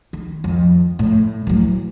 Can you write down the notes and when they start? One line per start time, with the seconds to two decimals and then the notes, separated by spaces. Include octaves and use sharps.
0.13 D#3
0.44 F2
0.99 A2
1.47 E3 F#3